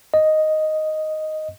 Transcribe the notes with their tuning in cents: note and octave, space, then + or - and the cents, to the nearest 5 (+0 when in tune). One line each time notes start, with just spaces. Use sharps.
D#5 +0